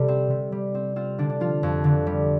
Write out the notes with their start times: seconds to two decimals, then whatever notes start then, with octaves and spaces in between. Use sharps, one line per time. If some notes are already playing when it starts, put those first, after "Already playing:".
Already playing: C3 G3 A4
0.08 C4
0.30 C3
0.52 G3
0.75 C4
0.96 C4 F4
1.18 D3 D4
1.30 D4
1.40 F3 F4
1.63 F2
1.84 D3
2.07 G3